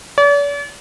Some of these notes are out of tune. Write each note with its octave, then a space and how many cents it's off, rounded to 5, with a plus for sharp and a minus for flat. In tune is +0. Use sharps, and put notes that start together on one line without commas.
D5 -45